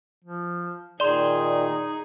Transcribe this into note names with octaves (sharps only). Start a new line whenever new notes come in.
F3
A#2 D#3 D#4 G#4 D5 C6